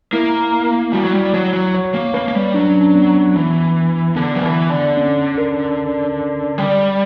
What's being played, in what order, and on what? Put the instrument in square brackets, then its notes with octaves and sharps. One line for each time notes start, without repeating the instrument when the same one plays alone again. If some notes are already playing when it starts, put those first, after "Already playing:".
[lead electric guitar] A#3 [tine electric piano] E4
[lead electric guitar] G3 [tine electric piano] F#4
[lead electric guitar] F#3
G3
[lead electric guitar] F#3 [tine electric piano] C#5
[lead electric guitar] F#3
[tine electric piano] C#5
[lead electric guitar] A#3
[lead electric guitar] A#3 [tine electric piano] B4
[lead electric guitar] A#3
G3
[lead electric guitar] F#3 [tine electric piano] D4
[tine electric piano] C#4
D4
B3
[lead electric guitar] E3 [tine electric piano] B3
[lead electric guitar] D3 [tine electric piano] B3
[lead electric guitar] F#3
E3
D3
[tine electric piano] C#4
A#4
[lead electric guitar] G3 [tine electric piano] D5